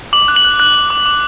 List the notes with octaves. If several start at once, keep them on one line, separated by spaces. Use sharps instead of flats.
D6 F#7
F#6
F#7
F#6
F#6
F#6
D6
D6